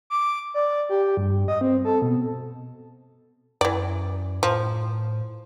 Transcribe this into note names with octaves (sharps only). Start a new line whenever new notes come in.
D6
D5
G4
G2
D#5
C4
A4
B2
F#2 E3 D5
A2 F3